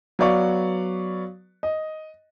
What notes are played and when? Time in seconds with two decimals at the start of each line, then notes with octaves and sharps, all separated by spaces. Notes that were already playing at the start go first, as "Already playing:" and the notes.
0.19 F#3 B3 B4 D5 F5 C#6
1.63 D#5